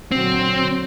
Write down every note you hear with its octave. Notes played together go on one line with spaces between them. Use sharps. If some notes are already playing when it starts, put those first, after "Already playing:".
A#2 D3 F#3 C4